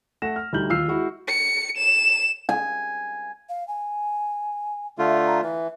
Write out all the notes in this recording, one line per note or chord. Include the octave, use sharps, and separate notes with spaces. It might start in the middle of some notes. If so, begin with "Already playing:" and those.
A3 F#5 A#6 E7
F6
D2 G3 A3 D#4 G6 F#7
D#2 F4 E6 F6 C7
G#3 E4 F#4
C#7
E7
G#5
F5
G#5
D3 A3 F4 E5
A#5
E3 E5